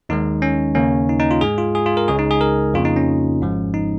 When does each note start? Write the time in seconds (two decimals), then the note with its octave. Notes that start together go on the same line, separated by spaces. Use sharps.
0.09 D#2 D#3 G#3 D#4
0.42 C#4
0.75 D#2 C#3 A#3 C#4
1.09 D#4
1.19 D#4
1.31 F4
1.41 G#2 G#3 G#4
1.58 F4
1.75 G#4
1.86 F4
1.97 A#4
2.08 C#2 C#3 G#3 G#4
2.19 D#4
2.31 G#4
2.41 A#4
2.74 F2 C#3 A#3 F4
2.85 D#4
2.97 C#4
3.41 G#1 G#2 F3 G#3
3.74 D#4